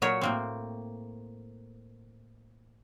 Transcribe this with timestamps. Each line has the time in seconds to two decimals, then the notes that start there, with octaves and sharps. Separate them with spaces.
0.02 A#2 F#3 A#4 C#5
0.21 A2 A#3 C4